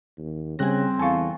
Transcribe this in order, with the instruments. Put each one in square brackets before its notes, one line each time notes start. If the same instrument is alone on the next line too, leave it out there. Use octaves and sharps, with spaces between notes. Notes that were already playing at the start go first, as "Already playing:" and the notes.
[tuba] D#2
[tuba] C#3 [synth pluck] G3 F#6 A#6 [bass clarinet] C4 [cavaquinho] C5 G#5
[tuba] E2 [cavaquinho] F4 A4 [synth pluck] G#5 C#6